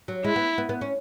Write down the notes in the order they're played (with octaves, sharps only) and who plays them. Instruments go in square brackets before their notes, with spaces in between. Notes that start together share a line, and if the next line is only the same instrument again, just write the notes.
[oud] F#3
[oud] G#3 [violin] E4
[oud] B3
B3
B3
C#4